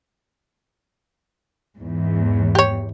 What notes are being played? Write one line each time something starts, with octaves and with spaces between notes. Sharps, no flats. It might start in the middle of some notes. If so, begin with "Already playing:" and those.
E2 G#2
G4 C#5